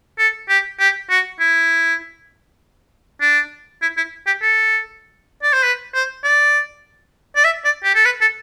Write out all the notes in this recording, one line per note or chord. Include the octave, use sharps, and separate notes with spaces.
A4
G4
G4
F#4
E4
D4
E4
E4
G4
A4
D5
C5
B4
C5
D5
D5
E5
D5
G4
A4
B4
A4